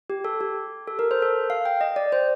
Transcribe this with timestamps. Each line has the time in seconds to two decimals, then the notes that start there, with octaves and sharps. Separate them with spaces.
0.10 G4
0.25 A4
0.41 G4
0.88 A4
0.99 A#4
1.11 C5
1.22 A4
1.50 F5
1.65 G5
1.81 D#5
1.96 D5
2.12 C5